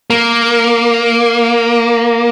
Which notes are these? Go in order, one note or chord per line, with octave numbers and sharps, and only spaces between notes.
A#3